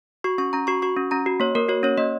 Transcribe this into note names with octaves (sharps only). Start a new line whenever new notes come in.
F#4 C#6
C#4 C#6
C#4 A#5
F#4 C#6
F#4 C#6
C#4
C#4 A#5
F#4
A#3 C#5
A#3 A#4
F#4 C#5
C#4 C#5
A#3 D#5